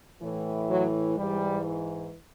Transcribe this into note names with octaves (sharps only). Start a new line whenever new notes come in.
A2 E3
F#3
G#2 E3 G3